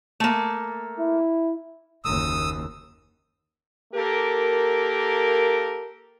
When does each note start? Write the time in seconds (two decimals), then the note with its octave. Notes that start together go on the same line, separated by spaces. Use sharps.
0.20 A3 A#3
1.00 E4
2.05 F#1 D#2 D#6 E6
3.94 A#3 G4 A4 A#4